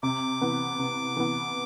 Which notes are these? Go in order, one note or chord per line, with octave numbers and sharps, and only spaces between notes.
C3 D6
E3 B3
C3
E3 B3